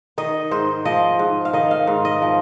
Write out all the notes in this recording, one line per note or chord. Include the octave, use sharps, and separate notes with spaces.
D#3 D#5
G#2 C5
F3 D#5
G#2
F5
D#3 D#5
F5
G#2
D#5
F3